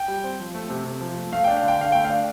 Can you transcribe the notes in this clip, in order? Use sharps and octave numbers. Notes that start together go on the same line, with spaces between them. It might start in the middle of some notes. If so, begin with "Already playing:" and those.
Already playing: G5
G3
C4
F3
A3
C3
C3
F3
A3
A3 F5
D4 G5
F5
D3 G5
D3 F5
A3 G5
F5
D4